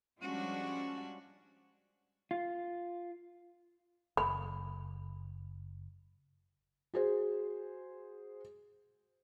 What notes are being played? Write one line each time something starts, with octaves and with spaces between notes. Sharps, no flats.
F3 G3 G#3 C#4 D4 F#4
F4
F#1 B5
F#4 G#4 C5